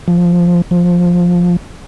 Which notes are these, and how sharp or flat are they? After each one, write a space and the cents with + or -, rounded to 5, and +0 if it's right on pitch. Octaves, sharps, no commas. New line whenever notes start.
F3 +0
F3 +10